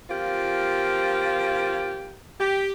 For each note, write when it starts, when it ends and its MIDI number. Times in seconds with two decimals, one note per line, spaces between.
0.10 2.15 53
0.10 2.15 58
0.10 2.15 60
0.10 2.15 65
0.10 2.15 67
2.40 2.71 67